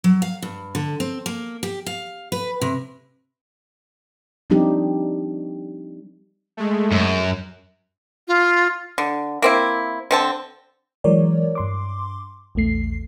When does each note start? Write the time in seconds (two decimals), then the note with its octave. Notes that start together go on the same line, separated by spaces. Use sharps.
0.04 F#3
0.22 F5
0.42 G2
0.75 D3
1.00 C4
1.26 A#3
1.63 G4
1.86 F5
2.32 B4
2.61 C3
4.50 F3 G3 C4 D4 D#4 G4
6.57 G#3 A3
6.91 F#2
8.28 F4
8.98 D3
9.42 A#3 C4 E4
10.11 D3 C4 A5
11.04 E3 F#3 G#3 A#4 C#5 D5
11.55 G2 C6 D6
12.55 A#1 E2 A3 C7